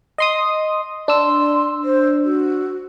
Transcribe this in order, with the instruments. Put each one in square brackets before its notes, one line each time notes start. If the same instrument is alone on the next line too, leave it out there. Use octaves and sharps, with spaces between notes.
[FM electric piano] D#5 C6 D#6
[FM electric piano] D4 E6 [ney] C6
[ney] C5
F#4